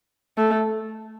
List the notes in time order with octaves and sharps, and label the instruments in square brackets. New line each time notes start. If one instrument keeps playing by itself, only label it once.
[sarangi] A3